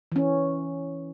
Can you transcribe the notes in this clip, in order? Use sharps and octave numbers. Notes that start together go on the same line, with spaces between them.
E3 C#4